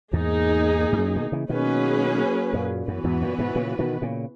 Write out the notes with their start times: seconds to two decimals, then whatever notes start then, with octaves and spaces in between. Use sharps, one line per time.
0.13 E2 G#2 A#3 D#4 G#4
0.93 G#2
0.99 F#2
1.15 B2 D#3
1.32 C#3 E3
1.49 B2 D#3 F#3 A#3 C#4 G#4 B4
2.53 F#2 A#2
2.87 F#2 E3 B3 F#4 B4
3.04 E2 G#2
3.21 F#2 A#2
3.39 G#2 B2
3.55 A#2 C#3
3.79 B2 D#3
4.02 A#2 C#3